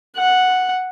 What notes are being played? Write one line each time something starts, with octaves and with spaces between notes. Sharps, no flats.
F#5